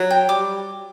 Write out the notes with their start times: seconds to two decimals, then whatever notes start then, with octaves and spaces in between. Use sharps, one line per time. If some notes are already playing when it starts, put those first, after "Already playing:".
Already playing: F#3
0.11 G5
0.29 G3 D6